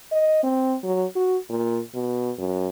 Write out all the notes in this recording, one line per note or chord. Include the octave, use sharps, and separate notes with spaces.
D#5
C4
F#3
F#4
A#2
B2
F#2